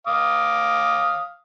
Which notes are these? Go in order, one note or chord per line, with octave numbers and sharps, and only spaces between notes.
F5 D6 D#6